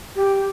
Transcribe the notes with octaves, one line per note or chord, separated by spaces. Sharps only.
G4